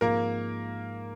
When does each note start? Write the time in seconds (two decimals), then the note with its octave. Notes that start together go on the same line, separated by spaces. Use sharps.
0.01 G#2 F3 G#3 A#3 C4 A#4